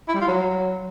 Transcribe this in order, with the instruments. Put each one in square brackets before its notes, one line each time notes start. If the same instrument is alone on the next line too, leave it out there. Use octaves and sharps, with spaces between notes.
[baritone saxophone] E4
G3
F4
F#3